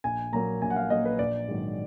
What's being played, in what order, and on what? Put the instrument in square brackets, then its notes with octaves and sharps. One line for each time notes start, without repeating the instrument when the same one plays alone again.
[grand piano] A#1 G#5
A#2 F#3 A#3 A#5
A#1 G#5
F#5
F5
A#2 F#3 A#3 D#5
B4
A#1 D5
G#2 D#3 F#3